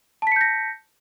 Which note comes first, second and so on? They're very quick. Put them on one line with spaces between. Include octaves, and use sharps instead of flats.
A5 B6 C#7 G6 A#6